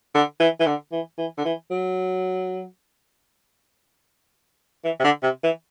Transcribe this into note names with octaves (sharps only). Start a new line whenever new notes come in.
D3
E3
E3
D3
E3
E3
D3
E3
F#3
E3
C3
D3
C3
E3